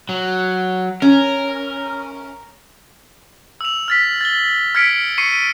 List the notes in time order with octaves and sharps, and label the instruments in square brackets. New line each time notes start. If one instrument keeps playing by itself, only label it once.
[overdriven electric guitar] F#3
[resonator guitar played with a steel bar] C#4 [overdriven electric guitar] A#4
[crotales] E6 F7
F6 A6 B6
A6 G7
F6 G#6 B6 C#7 D7
C#6 C7 C#7 D#7